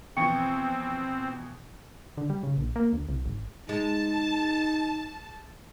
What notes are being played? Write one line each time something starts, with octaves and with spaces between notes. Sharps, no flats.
B2 E3 F3 C4 G5 C#6 C#7
D3
G3
C#3
A#1
A#3
D2
C2
G#1
G#3 D#4 A5